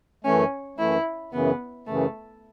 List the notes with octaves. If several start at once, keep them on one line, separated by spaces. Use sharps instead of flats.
F#2 E3 A3 C#4
F#2 E3 A3 E4
F#2 C#3 E3 B3
F#2 C#3 E3 A3